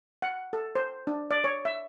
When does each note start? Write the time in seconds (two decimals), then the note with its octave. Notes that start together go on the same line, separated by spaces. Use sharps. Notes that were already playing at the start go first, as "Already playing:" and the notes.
0.22 F#5
0.53 A4
0.75 C5
1.07 D4
1.31 D5
1.44 C#5
1.65 E5